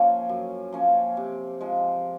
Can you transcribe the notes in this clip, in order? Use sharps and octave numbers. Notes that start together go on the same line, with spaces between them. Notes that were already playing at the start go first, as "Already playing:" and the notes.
Already playing: F3 A#3 C#4
F#2
F3 A#3 C#4
C3
F3 G#3